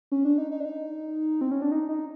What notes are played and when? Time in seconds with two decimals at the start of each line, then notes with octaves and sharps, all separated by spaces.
0.12 C#4
0.25 D4
0.38 D#4
0.51 D#4
0.60 D4
0.65 D#4
1.41 C4
1.51 C#4
1.62 D4
1.72 D#4
1.89 D#4